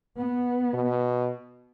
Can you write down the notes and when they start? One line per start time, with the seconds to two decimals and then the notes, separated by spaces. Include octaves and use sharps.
0.17 B3
0.74 B2